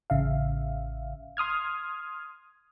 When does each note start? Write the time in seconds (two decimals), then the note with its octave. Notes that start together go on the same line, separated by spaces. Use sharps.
0.10 A1 C#3 E5 F5
1.37 C6 D#6 F6 G#6